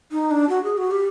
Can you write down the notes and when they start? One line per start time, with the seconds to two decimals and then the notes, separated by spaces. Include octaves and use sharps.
0.12 D#4
0.31 D4
0.49 F#4
0.64 G#4
0.77 F#4
0.91 G4